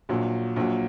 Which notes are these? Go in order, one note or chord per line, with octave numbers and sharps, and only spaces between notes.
A#1 A#2 F#3
A#1 A#2 F#3